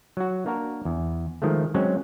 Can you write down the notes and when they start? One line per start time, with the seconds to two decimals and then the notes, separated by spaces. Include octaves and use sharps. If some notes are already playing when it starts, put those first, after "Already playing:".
0.17 F#3 F#4
0.46 A#3 D4 F#4 A#4
0.85 E2
1.42 D#3 F3 G#3 A3
1.74 F#3 G#3 C4 C#4